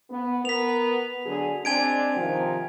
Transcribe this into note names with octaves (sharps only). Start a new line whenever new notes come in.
B3
B3 A#4 B4 B6 F7
D3 F#3 G#4
G#3 C4 D4 G#5 G#6 D7
C3 D#3 F3